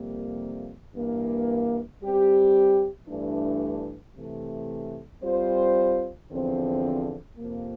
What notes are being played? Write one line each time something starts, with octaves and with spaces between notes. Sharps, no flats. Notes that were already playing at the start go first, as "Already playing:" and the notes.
Already playing: F2 C3 G3 A#3
G2 E3 A#3
G3 C4 G4
G2 E3 A3 D4
C3 E3 A3
G3 C4 F4 C5
E2 D3 F3 C4
F2 C3 F3 A#3